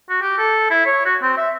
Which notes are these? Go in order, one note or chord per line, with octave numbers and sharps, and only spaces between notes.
F#4
G4
A4
E4
C#5
F#4
C4
E5